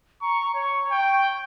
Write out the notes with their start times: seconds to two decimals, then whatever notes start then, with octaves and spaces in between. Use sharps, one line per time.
0.22 A#5 C#6
0.55 C#5 C#6
0.91 G5